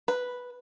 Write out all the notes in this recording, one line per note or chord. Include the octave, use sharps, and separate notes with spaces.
B4